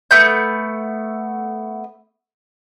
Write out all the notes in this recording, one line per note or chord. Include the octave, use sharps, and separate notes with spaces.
A3 B3 G6